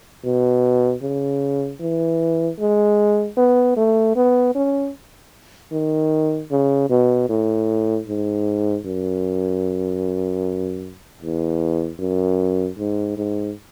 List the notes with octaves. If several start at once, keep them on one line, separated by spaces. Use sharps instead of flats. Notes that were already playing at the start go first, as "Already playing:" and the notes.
B2
C#3
E3
G#3
B3
A3
B3
C#4
D#3
C#3
B2
A2
G#2
F#2
E2
F#2
G#2
G#2